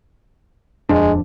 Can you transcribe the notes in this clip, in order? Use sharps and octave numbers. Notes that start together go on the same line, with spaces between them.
D#1 F2 G#3 D4